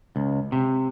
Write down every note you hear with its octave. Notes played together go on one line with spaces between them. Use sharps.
C#2
C3